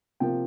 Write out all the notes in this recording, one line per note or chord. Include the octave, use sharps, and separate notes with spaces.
C3 F3 A#3 G5